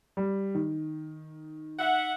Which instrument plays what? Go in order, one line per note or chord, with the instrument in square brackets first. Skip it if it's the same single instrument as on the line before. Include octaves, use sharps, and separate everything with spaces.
[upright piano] G3
D#3
[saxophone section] E5 F#5